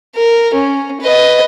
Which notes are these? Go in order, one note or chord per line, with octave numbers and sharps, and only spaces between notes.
A#4
C#4
B4 D#5